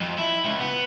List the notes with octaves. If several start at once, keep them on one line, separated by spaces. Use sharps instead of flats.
F2
E4
C#2
B3